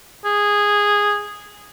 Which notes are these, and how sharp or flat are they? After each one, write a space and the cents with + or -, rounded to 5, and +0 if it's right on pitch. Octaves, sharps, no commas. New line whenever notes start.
G#4 -10